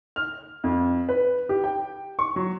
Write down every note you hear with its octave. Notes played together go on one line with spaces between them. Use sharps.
F6
F2
B4
G4
G5
C#6
F#3